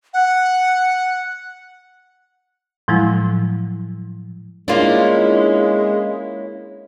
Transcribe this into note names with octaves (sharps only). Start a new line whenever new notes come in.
F#5
A2 F3 F#3 G#3 E4
G#3 A#3 C#4 D4 E4 F4